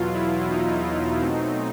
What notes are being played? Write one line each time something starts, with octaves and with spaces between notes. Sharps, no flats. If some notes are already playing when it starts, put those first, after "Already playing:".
Already playing: E2 B2 F#3 F4
E4
D#4
B2 F#3 A3 C4